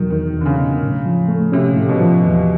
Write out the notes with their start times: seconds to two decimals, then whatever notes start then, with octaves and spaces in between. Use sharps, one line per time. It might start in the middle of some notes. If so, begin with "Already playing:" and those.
Already playing: E2 B2 D#3 F#3
0.10 E2 D#3
0.34 E2
0.41 D3
0.46 C#3
0.58 B2
0.81 A2
1.06 F3
1.28 A3
1.52 C3 C#4
1.76 A2
1.88 B2
2.00 F3
2.24 E2